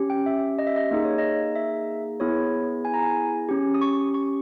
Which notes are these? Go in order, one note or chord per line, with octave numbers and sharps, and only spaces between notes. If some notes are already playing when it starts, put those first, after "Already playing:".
Already playing: C#4 G4
G5
E5
D#5
E5
D#5
A#3 D#4 G#4 D#5
C#5
D#5
E5
B3 E4 G#4 C#5
G#5
A#5
G#5
C#4 G4
D#6
C#6
C#6